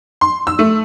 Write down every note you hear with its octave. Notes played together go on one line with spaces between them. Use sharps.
C6
E6
A3